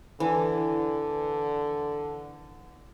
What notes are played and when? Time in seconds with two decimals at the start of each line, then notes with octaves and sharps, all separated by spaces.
0.20 D3 E3